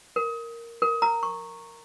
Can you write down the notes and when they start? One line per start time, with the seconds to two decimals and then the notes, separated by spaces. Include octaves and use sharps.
0.16 A#4
0.82 A#4
1.02 A#5
1.23 C#6